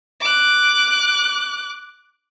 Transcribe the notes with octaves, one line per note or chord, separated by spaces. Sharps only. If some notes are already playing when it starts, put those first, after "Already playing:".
D6 F#6